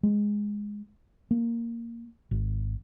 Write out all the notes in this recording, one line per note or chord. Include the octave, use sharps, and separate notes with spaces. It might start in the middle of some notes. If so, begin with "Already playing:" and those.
G#3
A#3
G#1